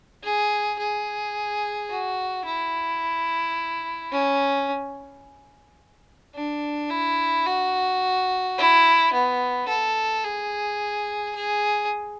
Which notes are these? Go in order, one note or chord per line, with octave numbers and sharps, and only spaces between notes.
G#4
G#4
F#4
E4
C#4
D4
E4
F#4
E4
B3
A4
G#4
G#4